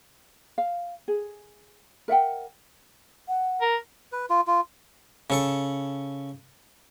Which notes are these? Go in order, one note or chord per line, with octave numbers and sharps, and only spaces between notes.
F5
G#4
A#4 E5 F#5 G5
F#5
A#4
B4
F4
F4
C#3 A4 C#6